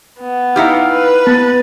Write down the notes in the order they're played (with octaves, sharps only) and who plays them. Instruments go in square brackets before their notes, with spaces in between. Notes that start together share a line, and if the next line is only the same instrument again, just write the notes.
[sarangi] B3
[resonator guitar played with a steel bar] D#4 E4 G4 [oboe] F5
[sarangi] B4
[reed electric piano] B3 [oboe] A5